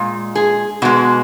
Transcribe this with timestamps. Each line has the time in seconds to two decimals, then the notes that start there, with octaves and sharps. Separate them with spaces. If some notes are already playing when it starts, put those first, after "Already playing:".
Already playing: A#2 G#3
0.35 G#4
0.82 B2 G#3 F#4